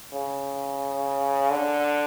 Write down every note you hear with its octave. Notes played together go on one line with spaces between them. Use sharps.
C#3
D3